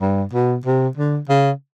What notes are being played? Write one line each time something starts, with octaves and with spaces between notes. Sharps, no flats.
G2
B2
C3
D3
C#3